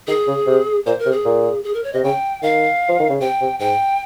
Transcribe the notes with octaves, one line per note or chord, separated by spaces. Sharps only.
D#3 G#4
C#3
C3
A#2 C5
A#4
C3
G#4
A#2
G#4
A#4
C#5
C3 D#5
C#3 G5
D#3 F5
F3
D#3
C#3
C3 G5
C3
G#2 G5